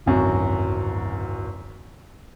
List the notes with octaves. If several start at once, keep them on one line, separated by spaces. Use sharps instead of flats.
D1 G#1 F#2 C3 F#4